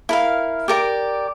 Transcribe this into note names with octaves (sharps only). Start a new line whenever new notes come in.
E4 A#4 F5
G4 A#4 D5